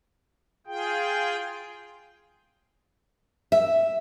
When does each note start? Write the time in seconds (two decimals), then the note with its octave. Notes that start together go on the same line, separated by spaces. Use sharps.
0.67 F4 G#4 G5
3.52 E5